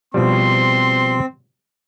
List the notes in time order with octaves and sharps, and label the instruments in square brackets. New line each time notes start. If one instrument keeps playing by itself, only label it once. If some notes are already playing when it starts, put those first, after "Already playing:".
[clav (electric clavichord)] B2 F3 G3 [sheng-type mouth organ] C4 [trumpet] C6